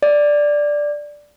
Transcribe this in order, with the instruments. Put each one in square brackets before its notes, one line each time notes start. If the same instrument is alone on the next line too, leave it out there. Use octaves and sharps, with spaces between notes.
[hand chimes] D5